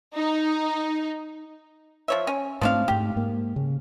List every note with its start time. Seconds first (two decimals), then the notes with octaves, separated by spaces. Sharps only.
0.15 D#4
2.08 F3 C#5 E5
2.27 C#4
2.61 G#2 F3 A3 C4 D4 F5
2.88 G#2 A3 G4
3.16 G#2 A#3
3.56 C#3